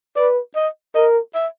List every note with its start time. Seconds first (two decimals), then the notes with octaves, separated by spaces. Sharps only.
0.16 B4 D5
0.56 D#5
0.95 A#4 D#5
1.35 E5